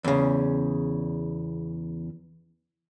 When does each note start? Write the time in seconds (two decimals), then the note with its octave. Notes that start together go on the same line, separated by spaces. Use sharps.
0.04 E2 C#3